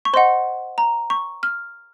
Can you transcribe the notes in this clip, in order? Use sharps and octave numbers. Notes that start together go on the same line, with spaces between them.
C#6
C5 D#5 F#5 C6
A#5
C#6
F6